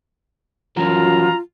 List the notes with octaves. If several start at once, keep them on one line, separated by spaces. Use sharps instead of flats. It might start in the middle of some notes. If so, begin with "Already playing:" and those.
F#2 E3 F3 F4 F#4 A#5